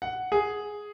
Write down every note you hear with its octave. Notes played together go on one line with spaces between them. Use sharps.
F#5
G#4